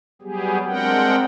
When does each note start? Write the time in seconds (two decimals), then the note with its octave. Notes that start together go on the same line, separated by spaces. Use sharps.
0.22 F#3 G3 B3 G4 G#4
0.67 G#3 C4 D4 A#4 F#5 G5